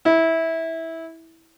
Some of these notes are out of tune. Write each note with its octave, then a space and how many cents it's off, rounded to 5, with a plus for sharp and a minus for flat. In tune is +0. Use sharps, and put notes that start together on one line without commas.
E4 -15